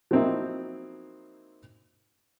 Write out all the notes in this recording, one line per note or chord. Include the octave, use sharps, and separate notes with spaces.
F3 F#3 A#3 C4 D#4 E4